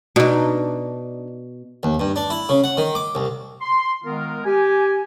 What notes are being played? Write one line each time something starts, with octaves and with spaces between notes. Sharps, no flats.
B2 D4 D#4
D#2
G2
D4
E4
C#3
F#5
D#3
D6
C2
C6
D#3 G#3 B3 F4 A#4
G4 G#5